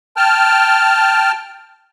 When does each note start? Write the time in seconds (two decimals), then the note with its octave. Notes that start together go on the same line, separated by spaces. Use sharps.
0.17 G5 A5 F6